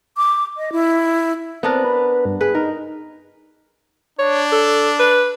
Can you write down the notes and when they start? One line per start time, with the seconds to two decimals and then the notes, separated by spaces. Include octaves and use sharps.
0.17 D6
0.57 D#5
0.72 E4
1.63 B3 C4 D4 A#4
1.84 B4
2.25 G2
2.41 G#4 B4
2.55 D#4 A#4
4.19 D4 C#5
4.52 A4
4.99 B4